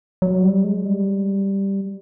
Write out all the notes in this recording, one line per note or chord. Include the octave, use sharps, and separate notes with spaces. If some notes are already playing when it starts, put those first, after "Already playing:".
F#3
G3
G#3
G3